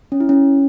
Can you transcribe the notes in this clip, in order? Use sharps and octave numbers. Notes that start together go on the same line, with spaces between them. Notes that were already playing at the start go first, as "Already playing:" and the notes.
C#4
E4
C#4